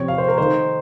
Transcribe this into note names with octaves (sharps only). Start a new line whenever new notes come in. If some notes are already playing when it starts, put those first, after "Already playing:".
Already playing: C3 F3 C4 C#5
F5
C5
A#4
D#3 A3 D#4 C5